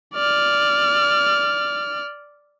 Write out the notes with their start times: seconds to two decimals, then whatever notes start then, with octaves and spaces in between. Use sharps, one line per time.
0.15 D5 F6